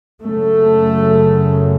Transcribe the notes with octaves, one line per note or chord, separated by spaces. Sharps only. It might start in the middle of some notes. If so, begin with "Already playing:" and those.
F#2 C#3 A3